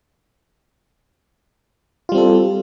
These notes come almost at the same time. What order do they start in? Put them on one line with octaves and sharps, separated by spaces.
F4 G3 C4 A4